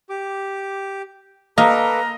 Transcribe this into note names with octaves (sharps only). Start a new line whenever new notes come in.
G4 D6
A#3 A4 B4 D#5 A#5 D6